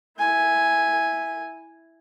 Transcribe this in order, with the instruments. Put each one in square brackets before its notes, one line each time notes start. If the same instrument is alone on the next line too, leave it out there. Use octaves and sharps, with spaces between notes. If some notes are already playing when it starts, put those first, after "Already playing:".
[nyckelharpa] E4 G#5